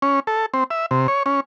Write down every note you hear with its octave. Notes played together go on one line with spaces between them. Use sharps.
C#4
A4
C4
E5
C3
C#5
C#4